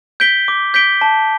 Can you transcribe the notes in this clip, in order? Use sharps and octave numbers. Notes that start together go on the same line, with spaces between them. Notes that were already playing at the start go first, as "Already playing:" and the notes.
G6 B6 D7 G7
D6
G6 B6 D7 G7
A5